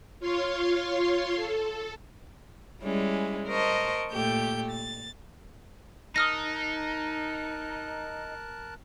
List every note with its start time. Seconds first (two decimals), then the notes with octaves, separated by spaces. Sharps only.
0.20 F4 C#5 F5 C6
1.35 A4
2.83 G3 G#3 C#4 E4
3.48 A#4 C5 D#5 A5 C#6
4.12 A#2 A3 G4 G6
4.71 A6
6.16 D#4 A#4 A5 D#6 F6 F#6 A#6